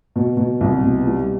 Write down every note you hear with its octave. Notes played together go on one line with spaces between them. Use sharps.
B2
B2
C2
B2
G3